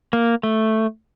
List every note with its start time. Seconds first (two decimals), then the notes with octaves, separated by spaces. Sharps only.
0.13 A#3
0.43 A3